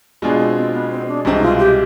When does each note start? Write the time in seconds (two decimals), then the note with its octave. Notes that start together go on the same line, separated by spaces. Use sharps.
0.22 B2 G#3 B3 D4 F4 G#4
0.39 C4
0.56 C4
0.73 B3
0.90 C4
1.08 D4
1.25 C2 B2 G#3 C4 D#4
1.41 F4
1.58 G4